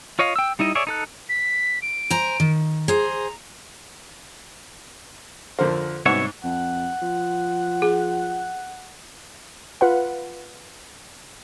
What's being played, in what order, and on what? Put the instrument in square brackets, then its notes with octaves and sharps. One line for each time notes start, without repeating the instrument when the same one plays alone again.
[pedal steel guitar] F4 C#5 D#5 F5
G5 E6
G3 D#4 E4 D#5
G#4 C#5 D5 E5
D#4 A4 F#6
[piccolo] B6
D7
[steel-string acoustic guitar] C5 G#5 A#5
D#3
[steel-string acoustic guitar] G#4 C5 [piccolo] A#5
[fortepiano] F2 D3 A#4 [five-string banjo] C5
[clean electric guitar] C2 C#5 E5 [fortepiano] G#2 C#6 [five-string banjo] B3 F#4
[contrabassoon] F2 [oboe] F#5
[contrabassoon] F3
[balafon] G#4
[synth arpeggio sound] F4 B4 F#5